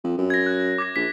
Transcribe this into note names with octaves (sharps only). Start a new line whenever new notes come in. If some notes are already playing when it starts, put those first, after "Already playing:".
F2
F#2
G#6 A#6
F#6
D6 G#6 A#6
A#1 B6